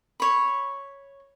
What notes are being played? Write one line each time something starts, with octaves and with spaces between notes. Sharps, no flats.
C#5 B5